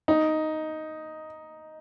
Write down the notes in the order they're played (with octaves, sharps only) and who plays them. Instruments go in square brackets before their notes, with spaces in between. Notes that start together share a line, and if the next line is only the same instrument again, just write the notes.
[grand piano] D#4